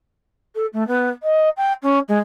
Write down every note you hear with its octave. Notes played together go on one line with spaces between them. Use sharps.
A4
A3
B3
D#5
G5
C#4
G#3